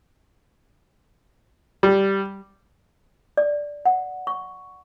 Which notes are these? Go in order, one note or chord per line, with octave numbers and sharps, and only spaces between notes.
G3
D5
F#5
C#6